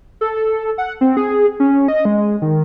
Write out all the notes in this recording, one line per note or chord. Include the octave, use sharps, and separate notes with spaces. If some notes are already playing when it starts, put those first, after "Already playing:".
A4
F#5
C4
G#4
C#4
D#5
G#3
D#3